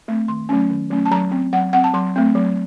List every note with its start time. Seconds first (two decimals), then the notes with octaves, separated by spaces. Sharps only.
0.08 A3 C4
0.28 D#3 C6
0.49 F#3 A3 C#4
0.70 D#3
0.90 F#3 A3 C#4
1.05 A5
1.12 F#3 A#5
1.32 C4
1.53 F#3 F#5
1.73 C4 F#5
1.84 A5
1.94 F#3 C6
2.16 A3 C4
2.35 F#3